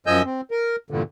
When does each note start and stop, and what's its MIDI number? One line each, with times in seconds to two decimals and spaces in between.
0.07 0.22 42
0.07 0.22 53
0.07 0.22 75
0.07 0.22 80
0.07 0.22 88
0.07 0.22 91
0.25 0.41 60
0.51 0.76 70
0.90 1.02 40
0.90 1.02 43
0.90 1.02 46
0.90 1.02 50